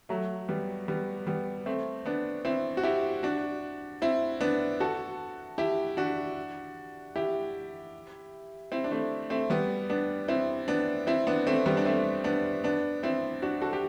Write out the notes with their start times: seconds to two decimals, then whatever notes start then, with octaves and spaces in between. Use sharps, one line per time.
0.09 F#3 A3
0.48 G3 B3
0.88 G3 B3
1.27 G3 B3
1.66 A3 C4
2.06 B3 D4
2.45 C4 E4
2.77 F#4
2.83 E4 G4
3.23 D4 F#4
4.02 C4 E4
4.41 B3 D4
4.80 F#4 A4
5.58 E4 G4
5.97 D4 F#4
7.16 E4 G4
8.72 C4 E4
8.84 D4
8.91 A3 C4
9.30 A3 C4
9.50 G3 B3
9.90 B3 D4
10.28 C4 E4
10.68 B3 D4
11.07 C4 E4
11.27 B3 D4
11.47 A3 C4
11.66 G3 B3
11.77 D4
11.85 A3 C4
12.24 B3 D4
12.64 B3 D4
13.03 C4 E4
13.42 D4 F#4
13.61 F#4 A4
13.73 G4